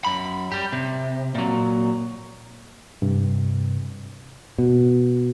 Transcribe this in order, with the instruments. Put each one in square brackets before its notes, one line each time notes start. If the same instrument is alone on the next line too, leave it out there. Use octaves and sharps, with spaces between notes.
[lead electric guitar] F#2 B5
G3 G4
C3
A#2 F#3
[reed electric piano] G2 C3
[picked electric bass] B2